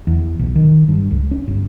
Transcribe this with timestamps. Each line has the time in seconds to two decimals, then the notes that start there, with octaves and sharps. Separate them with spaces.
0.07 E2
0.39 B1
0.55 D#3
0.88 G2
1.11 C#2
1.31 C#4
1.47 G1